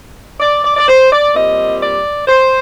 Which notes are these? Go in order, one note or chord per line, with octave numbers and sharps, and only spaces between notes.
D5
D5
D5
C5
D5
A#2 G3 C4 D#5
D5
C5